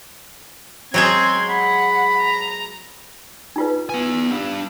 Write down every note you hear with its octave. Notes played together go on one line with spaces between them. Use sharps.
F#3 G#3 C4 G#4 C6 G#6
F#5 B5
A#5
D#4 F4 B4
B3 G#5
D4 G4